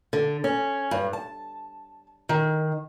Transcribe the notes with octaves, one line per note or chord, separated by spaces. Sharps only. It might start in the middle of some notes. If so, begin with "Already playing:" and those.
D3
C#4
G2
A5
D#3